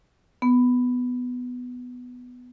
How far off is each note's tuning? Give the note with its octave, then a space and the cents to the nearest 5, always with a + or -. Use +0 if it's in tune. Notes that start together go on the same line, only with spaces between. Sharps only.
B3 +5